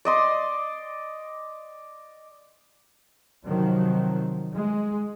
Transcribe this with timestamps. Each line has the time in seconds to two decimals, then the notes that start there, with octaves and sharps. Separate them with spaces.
0.05 D5 D#5 C6
3.44 C3 D#3 F3 F#3
4.55 G#3